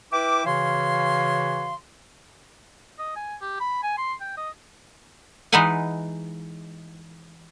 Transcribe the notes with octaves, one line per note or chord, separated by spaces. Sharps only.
E4 B4 E5 G5 D6
C#3 E3 F#4 C#5 F5 C6
D#5
G#5
G4
B5
G#5
C6
G5
D#5
E3 G#3 D#4 B4 F#5 G#5